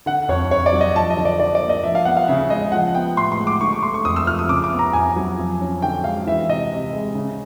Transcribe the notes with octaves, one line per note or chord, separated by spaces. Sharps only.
D3 F#5
F2 C#5
F2 C#5
D5
F#3
D#5
F3 A5
D#5
D3
D5
D3 D5
D5
A#3
D#5
F3 E5
F5
B3 F#5
F5
C#3 E5
G#3 D#5
F3 F#5
B3 G5
A2 C6
C6
G#3
D6
D3 C#6
C#6
A3 C6
C#6
F2 D#6
E6
F3 F6
D#6
C#3 D6
D6
B3
A#5
F2 G#5
F#3
F3
C#4
D3 G5
G#3 F5
E3 E5
C3 D#5
C3
G#3
C#3